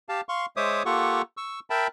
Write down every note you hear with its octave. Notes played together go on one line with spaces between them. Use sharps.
G4 F5 A5
F5 C6 C#6
G#3 C5 C#5 E5 D6 D#6
A#3 F4 G4 A4 F#5 C#6
C#6 E6
A#4 E5 G5 A5 B5